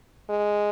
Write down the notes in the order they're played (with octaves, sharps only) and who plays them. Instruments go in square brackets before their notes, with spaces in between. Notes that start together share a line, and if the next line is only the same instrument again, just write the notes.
[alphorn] G#3